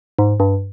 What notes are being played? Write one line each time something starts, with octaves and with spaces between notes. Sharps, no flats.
G#2
G2